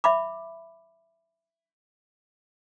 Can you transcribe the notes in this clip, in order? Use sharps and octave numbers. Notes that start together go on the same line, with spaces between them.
E5 B5 D6